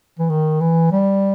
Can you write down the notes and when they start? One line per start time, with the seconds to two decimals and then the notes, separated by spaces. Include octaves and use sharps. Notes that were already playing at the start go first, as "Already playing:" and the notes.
0.19 E3
0.29 D#3
0.61 E3
0.91 G3